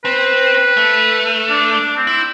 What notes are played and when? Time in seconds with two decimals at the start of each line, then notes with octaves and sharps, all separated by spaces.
0.05 C4 B4
0.77 A3
1.49 D4
1.72 D4
1.97 C4
2.07 E4